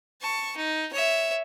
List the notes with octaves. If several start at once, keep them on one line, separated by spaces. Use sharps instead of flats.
A5 C#6
D#4
C#5 E5